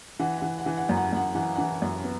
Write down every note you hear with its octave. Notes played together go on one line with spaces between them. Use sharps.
E3 F#5
E3 F#5
F#5
E3
F#5
F#2
F#5
F#2 F#5
E3 F#5
E3 F#5
F#2
B3